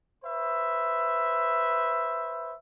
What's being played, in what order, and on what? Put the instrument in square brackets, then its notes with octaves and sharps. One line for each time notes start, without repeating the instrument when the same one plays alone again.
[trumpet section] B4 C5 E5